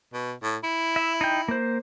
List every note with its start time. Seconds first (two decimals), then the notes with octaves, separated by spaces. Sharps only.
0.13 B2
0.42 A2
0.63 E4
0.96 E5
1.21 D#4 G5
1.48 A#3 C5